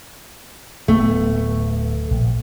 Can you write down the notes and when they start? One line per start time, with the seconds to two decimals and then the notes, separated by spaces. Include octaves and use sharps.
0.88 D1 A3 B3
2.11 A#1